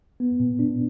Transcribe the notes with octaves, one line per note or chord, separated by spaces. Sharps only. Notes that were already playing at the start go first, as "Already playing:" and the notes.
B3
A#2
D4